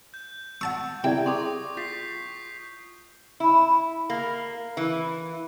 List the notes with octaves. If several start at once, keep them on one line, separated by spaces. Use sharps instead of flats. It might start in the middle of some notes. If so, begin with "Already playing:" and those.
G6
F#5 A5 C#6 E6
C3 E4 D5 G5
G#4 C6 C#6 D#6
F4 G6 B6 C7
E4
A#3
E3